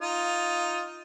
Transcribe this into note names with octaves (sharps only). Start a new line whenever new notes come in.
D#4 F4